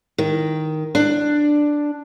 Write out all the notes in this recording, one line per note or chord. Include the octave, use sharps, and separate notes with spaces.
D#3
D4